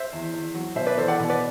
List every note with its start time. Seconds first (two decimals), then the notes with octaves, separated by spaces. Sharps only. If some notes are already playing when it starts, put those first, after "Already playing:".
Already playing: C5 E5
0.13 E2
0.33 E2
0.55 F#3
0.76 B2 C5 E5
0.86 B4 D5
0.97 E2 A4 C5
1.08 D5 F#5
1.19 B2
1.30 B4 D5